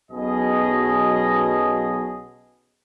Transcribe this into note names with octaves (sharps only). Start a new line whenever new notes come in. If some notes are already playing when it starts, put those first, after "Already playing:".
B1 B2 F#3 C#4 G#4 D#5